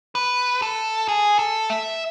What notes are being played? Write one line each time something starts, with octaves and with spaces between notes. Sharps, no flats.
B4
A4
G#4
A4
E5